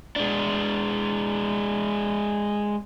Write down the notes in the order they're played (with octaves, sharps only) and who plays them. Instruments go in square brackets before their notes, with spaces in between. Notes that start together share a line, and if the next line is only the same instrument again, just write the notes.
[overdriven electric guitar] G#3 D4